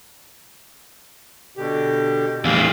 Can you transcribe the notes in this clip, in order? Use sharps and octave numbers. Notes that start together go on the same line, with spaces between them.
B2 D3 G4
E2 A2 C3 F5 E6